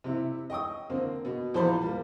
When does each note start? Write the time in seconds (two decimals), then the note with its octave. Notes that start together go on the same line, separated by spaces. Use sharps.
0.04 C3 E4
0.50 D#5 G5 C#6 D#6
0.90 D3 A#3 C4
1.25 B2
1.54 A#1 E2 A#2 C5 A5 B5
1.82 G3 A#3